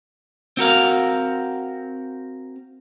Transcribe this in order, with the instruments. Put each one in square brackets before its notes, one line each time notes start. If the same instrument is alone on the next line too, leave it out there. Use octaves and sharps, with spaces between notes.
[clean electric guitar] C4 F#4 A#4 F5